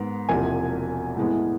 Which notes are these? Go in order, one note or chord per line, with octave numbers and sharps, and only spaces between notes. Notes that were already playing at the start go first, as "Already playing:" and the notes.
Already playing: G#2 D#3 B3
E1 E2 C3 F3 A#3 G#5
A2 E3 G#3 B3